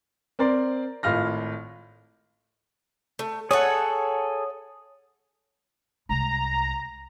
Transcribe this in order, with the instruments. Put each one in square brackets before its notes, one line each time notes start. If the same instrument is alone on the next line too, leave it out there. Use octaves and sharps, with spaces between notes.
[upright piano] C4 A#4 D5 C6
G#1 A2 F4 F6 A#6
[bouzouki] A3
[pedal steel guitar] G#4 A4 [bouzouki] C#5 E5 F#5
[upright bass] C2 G#3 [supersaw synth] A#5